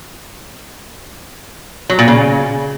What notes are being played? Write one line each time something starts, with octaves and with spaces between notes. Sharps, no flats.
F#3
A#2
C#3